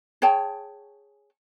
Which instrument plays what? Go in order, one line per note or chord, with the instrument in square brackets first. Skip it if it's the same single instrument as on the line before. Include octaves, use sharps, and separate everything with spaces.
[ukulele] G#4 C#5 G5 A5